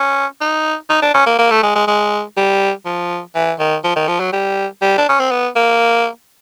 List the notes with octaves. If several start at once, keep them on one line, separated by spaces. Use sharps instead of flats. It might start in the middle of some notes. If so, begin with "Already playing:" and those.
Already playing: C#4
D#4
D#4
D4
C#4
A#3
A#3
A3
G#3
G#3
G#3
G3
F3
E3
D#3
F3
D#3
F3
F#3
G3
G3
D4
C#4
C4
B3
A#3